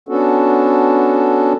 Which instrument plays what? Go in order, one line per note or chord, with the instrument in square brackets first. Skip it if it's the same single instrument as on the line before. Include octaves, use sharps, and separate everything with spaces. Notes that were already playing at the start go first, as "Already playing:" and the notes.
[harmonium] B3 C#4 D4 F#4 A4